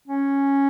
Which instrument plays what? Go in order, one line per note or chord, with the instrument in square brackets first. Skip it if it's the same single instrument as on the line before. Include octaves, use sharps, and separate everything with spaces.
[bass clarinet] C#4